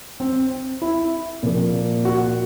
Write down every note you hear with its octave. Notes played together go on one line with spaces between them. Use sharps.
C4
E4
A#2 F3 A#3
F#4